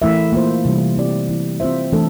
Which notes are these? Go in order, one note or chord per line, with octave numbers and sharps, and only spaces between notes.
E3 A3 E4 A#4 E5
A#3 F4 C5
C3 E3 G3
C4 E4 G4 D5
E3 A#3 E4
C4 F4 C5 E5
E3 A3 D4 A4